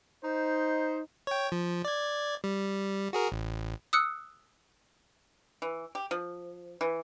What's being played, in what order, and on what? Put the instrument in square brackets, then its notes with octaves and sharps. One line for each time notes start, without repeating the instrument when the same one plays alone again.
[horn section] D#4 C5
[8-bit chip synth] C#5 G5
F3
D5 G#6
G3
F#4 G#4 A#4
A1
[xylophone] D#6 E6 F#6 C#7
[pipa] E3
G4
F3
E3